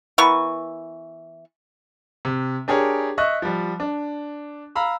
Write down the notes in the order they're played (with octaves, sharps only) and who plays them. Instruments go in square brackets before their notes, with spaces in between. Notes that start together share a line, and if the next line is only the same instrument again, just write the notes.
[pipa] E3 B3 A#4 C#6
[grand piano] C3
D4 G4 G#4 A#4 C#5
D#5 E5 C#6 F#6
F3 G3
D4
F5 A#5 B5 E6